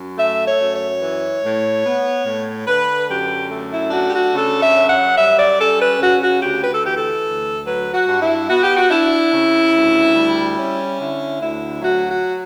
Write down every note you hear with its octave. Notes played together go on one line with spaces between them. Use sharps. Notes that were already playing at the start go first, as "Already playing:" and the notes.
Already playing: F#2
A3 E5
C#5
F#2
C#5
E3
A2
B3
A2
D3 B4
F#2 G4
A3
E4
D4 F#4
G4
F#4
C#3 A4
E5
F#2
F#5
G3 E5
D5
C#4 A4
B4
C#3 F#4
F#4
D2 G4
B4
A4
E3 G4
A4
D2
F#3 B4
F#4
G2
E4
B3 F#4
G4
F#4
D4 E4
C#3
D2
G3
C#4
D3 E4
D2 E4
F#3 F#4
F#4